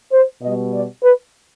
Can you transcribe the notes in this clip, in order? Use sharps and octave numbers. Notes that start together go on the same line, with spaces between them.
C5
B2 D#5
G3
D5
B4